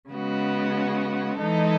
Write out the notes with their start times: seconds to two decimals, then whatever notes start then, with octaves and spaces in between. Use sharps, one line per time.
0.10 C#3 G#3 B3 F#4
1.38 E3 G#3 D#4 A4